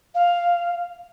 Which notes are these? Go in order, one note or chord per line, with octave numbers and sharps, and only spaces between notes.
F5